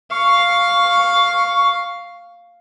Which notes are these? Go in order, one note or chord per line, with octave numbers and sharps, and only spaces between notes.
F5 C#6